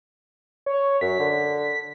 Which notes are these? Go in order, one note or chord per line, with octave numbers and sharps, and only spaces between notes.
C#5
F#2 B6
D3